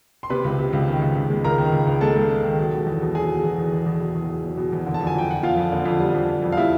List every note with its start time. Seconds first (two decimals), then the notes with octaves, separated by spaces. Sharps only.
0.23 C6
0.30 C3 B4 B5
0.44 C#2
0.59 C3
0.73 C#2
0.87 D#3
1.02 C#2
1.15 C#2
1.30 G#3
1.44 C#2 A#4 A#5
1.58 D#3
1.72 C#2
1.87 C#2
2.01 G#3 A4 A5
2.16 G#3
2.30 G#3
2.44 D#3
2.59 F#3
2.73 B2
2.86 E2
3.01 B2
3.15 F#3 G#4 G#5
3.29 F#3
3.44 E2
3.58 E2
3.72 E2
3.86 E2
4.00 B2
4.15 E2
4.29 B2
4.44 F#3
4.57 B2
4.73 E2
4.86 D3
4.94 A5
5.01 F2
5.07 G#5
5.15 F2 G5
5.29 F2 F#5
5.43 F2 F4 F5
5.58 F2
5.72 D3
5.86 F2
6.00 G3
6.14 F2
6.28 F2
6.42 F2
6.52 F5
6.57 G3 E4 E5